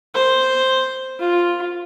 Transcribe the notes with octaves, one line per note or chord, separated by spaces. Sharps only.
C5
F4